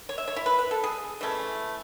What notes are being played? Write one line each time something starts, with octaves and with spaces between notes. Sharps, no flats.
C#5
E5
C#5
E4
B4
B4
A4
G#4
E3 A3 C#4